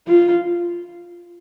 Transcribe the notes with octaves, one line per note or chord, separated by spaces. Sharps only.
F4